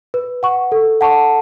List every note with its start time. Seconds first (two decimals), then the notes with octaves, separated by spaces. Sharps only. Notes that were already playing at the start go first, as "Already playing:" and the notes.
0.14 B4
0.43 F#5 C#6
0.72 A4
1.01 F#5 A5 C#6